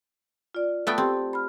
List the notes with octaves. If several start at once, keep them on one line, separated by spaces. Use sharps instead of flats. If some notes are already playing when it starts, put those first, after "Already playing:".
F4 D5
A3 B3 G5 A5 D#6 A6
C4 G4
B5 F6